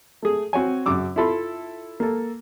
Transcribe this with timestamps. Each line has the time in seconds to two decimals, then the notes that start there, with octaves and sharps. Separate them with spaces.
0.23 A3 G#4
0.53 C4 F#4 C#5 G#5
0.86 F#2 C#3 D6 E6
1.16 E4 F4 A4 B5 C6
2.00 A#3 A4